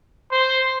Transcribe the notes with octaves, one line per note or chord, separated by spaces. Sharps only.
C5